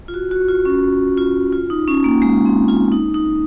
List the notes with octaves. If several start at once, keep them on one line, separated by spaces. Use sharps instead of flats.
F4
F#4
F#4
F4
C#4
F4
F4
D#4
C#4
A#3
G#3
C4
F4
D#4
D#4